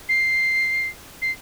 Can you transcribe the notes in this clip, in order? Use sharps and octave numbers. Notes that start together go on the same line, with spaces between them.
C7
C7